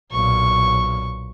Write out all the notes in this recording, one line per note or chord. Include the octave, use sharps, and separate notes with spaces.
B1 A#2 C#6